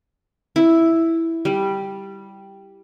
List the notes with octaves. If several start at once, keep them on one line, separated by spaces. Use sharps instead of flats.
E4
G3